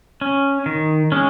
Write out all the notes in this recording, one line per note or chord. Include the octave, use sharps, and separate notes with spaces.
C#4
D#3
G#3 C#4